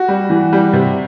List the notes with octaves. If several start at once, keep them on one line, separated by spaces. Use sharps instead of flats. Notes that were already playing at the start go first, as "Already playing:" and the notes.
Already playing: F#4
G3
E3
G3
C3